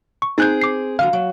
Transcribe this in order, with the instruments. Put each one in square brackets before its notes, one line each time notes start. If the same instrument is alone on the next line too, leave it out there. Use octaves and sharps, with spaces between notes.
[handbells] C#6
[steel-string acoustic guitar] C4 G#4 C5 [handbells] D#4 F#6 G6
[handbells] D6 C7
[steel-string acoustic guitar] D3 F3 F#3 [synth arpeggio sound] F5
[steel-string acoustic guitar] F#3